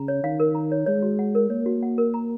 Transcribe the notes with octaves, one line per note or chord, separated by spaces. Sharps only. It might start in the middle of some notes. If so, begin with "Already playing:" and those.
Already playing: C#3 A#5
C#5
D#3 F5
A#4
A#5
C#5
G#3 C#5
F#4
F#5
A#4
A#3 C#5
F#4
F#5
A#4
A#5